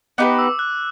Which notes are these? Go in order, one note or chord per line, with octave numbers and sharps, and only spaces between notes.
B3 D#4 G4 B4 D6
E6
F#6